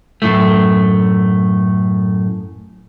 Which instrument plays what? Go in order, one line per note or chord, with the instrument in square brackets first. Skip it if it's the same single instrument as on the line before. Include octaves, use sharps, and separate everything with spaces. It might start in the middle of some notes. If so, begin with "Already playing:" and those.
[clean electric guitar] F#2 A2 A3